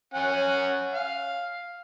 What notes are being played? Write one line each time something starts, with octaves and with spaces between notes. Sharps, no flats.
C#4 F#5 G#5
F5